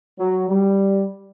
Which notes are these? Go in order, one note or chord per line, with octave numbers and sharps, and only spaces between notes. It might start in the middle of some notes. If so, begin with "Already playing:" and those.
F#3
G3